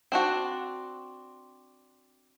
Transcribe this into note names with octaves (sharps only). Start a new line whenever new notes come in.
C4 D4 F#4